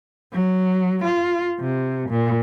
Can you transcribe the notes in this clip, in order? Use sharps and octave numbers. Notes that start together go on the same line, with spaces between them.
F#3
F4
C3
A#2